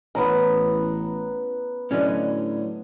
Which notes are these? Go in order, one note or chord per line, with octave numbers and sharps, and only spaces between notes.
A1 B3 C#4 E4 A#5
A2 D3 F#3 C#4 D5 D#5